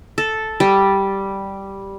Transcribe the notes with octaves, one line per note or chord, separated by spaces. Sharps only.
A4
G3